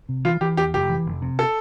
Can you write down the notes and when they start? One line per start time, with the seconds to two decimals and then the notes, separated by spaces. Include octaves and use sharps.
0.09 C3
0.25 E3 F4
0.41 E3 G4
0.57 E2 G4
0.74 F1 G4
0.89 E3
1.06 F1
1.22 C3
1.39 A4